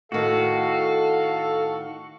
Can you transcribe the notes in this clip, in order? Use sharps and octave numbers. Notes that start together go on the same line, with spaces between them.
A2 D#3 F#4 A4 F5